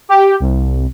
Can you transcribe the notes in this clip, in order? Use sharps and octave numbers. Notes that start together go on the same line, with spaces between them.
G4
C2